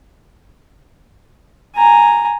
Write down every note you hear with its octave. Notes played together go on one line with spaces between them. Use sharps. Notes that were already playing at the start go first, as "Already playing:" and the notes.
G#5 A#5